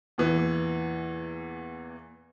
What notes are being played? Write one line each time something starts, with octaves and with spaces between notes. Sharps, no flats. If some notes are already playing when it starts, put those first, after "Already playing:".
E2 A#2 E3